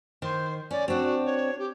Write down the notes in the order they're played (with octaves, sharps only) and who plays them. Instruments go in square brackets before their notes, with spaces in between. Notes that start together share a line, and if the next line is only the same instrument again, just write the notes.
[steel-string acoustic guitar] D#3 [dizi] C5
[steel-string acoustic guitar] C#4 [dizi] D5
[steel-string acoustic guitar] C4 D4 [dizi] F#4
[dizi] C#5
G4